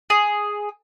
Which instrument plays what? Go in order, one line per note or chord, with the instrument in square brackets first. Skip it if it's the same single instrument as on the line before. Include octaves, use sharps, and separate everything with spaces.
[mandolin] G#4